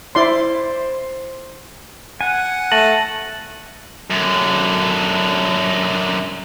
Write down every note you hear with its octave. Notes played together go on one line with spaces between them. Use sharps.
E4 C5 D5 C6
F#5 G#5
A3 A5 A#6 D#7 F#7
F#2 D3